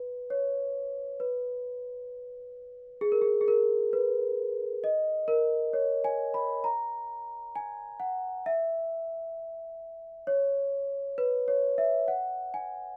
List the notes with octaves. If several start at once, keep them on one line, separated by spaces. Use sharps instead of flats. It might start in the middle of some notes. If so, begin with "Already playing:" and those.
Already playing: B4
C#5
B4
G#4
A#4
G#4
G#4
A#4
B4
D#5
A#4
C#5
G#5
B5
A#5
G#5
F#5
E5
C#5
B4
C#5
E5
F#5
G#5